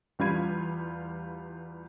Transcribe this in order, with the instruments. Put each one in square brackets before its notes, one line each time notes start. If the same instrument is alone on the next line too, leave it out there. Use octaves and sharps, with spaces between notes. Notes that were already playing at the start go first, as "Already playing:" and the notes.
[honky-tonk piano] E2 G3 F4 B5 G#6 D#7